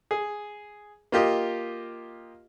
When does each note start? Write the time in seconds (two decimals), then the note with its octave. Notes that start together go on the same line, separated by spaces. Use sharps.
0.11 G#4
1.12 A#3 F4 G4 D#5